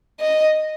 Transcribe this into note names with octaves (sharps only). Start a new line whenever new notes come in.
D#5